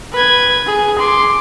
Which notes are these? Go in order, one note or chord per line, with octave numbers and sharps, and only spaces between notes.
B4 G#6
G#4
C6 D6